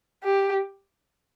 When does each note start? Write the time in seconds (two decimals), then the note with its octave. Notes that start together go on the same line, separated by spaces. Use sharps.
0.24 G4